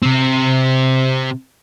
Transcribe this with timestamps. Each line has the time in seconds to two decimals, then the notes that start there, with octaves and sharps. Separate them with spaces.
0.03 C3 C4